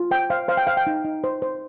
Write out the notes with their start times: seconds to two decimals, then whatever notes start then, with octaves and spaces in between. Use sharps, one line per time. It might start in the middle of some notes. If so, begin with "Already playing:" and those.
Already playing: F4
0.11 C5 G5
0.30 C5 F5
0.48 C5 F5
0.57 G5
0.67 C5 F5
0.77 G5
0.87 D#4
1.05 D#4
1.24 C5
1.42 C5